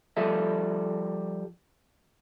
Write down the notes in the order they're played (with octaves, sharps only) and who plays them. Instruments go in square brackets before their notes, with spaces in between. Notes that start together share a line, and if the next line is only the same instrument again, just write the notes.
[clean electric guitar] F3 G3 A4 E5